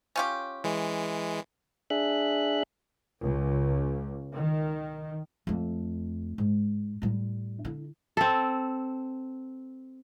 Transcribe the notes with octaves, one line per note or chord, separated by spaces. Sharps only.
C#4 F4 G4
E3 G#3
D4 G#4 E5 F#6
C#2
D#3
F2 A3
G#2
A2 G3
D3 E4
C4 A4